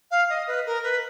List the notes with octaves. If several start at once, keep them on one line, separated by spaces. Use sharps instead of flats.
F5
D#5
B4
A#4
B4